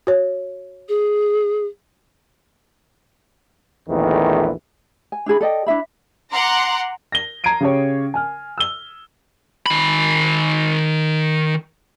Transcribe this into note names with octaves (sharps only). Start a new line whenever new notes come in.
F#4 C#5
G#4
A#1 E2 D#3 E3 A3
G#5
D4 E4 G#4 B5
A4 D5 D#5 G5
D4 E4 E5 B5
F#5 A#5 C6 D6
A#6 G7
A#5 G#6 C7 D7 D#7
C#3 G4 C#5
G#5 F6
E6 G7
D#3 B5